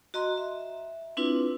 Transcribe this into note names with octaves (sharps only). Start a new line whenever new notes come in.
F#4 D#5 A#5 C6
E5
C4 D4 E4 F4 B4